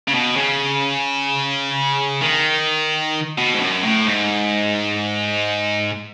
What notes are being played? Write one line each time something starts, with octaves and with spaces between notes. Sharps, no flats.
C#3
B2
C#3
D#3
B2
G#2
F#2
A2
G#2